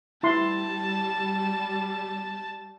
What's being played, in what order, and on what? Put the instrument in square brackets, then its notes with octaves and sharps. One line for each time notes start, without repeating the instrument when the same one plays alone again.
[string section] G3 [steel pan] E4 C6 [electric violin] A5